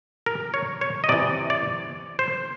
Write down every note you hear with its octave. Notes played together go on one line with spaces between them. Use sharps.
A#4
C#5
C#5
D#5
C3 E3 D5
D5
C5